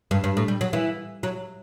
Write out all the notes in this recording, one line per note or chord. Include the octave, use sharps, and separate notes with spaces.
G2
G2
A2
G3
F#3
E3
F#3